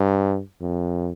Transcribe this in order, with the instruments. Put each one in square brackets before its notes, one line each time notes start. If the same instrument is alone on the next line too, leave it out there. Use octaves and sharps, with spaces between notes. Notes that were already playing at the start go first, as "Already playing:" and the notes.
Already playing: [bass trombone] G2
F2